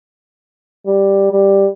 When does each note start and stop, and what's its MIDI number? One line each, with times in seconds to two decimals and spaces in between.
0.87 1.29 55
1.32 1.68 55